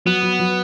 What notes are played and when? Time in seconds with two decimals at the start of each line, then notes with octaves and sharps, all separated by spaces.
0.05 F#3 B3
0.23 F#3
0.40 F#3